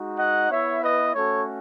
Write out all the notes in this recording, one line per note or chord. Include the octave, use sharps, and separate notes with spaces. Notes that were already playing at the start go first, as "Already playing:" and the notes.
Already playing: G#3 D#4 F#4
D#5 F#5
B3 E4 C#5 E5
B4 D#5
A3 C#4 F#4 A4 C#5